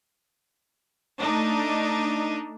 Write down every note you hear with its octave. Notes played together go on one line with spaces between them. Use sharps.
A3 D4 D#4